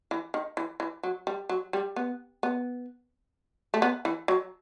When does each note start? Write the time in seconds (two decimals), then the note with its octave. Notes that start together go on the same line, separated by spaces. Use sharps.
0.11 E3
0.34 D#3
0.57 E3
0.80 E3
1.03 F#3
1.27 G3
1.49 F#3
1.73 G3
1.96 B3
2.43 B3
3.74 A3
3.82 B3
4.05 E3
4.28 F#3